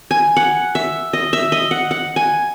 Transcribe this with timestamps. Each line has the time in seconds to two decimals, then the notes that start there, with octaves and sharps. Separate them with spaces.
0.11 G#5
0.37 F#5
0.75 E5
1.13 D#5
1.33 E5
1.52 D#5
1.71 F#5
1.91 F#5
2.16 G#5